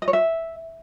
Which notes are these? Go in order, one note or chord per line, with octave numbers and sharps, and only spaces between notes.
D#5
C#5
E5